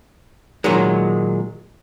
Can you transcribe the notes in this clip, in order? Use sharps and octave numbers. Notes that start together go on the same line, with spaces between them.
A#2 D#3 F#3 G#3